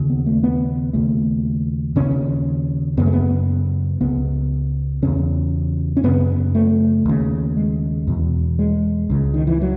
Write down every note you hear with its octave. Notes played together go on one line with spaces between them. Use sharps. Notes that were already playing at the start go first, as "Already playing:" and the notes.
Already playing: D#2 C#3
B3
A3
B3
D#2 C#3 A3
D#2 C#3 C#4
F#2 C#3 B3
A3
B3
C#2 C#3 B3
E2 C#3 C#4
C#4
F#2 C#3 B3
A3
D#2 C#3
G#3
E2 B2
G#3
C#2 C#3
D#3
E3
F#3